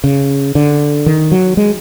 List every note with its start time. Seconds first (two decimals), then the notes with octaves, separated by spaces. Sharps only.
0.04 C#3
0.55 D3
1.06 D#3
1.32 F#3
1.57 G#3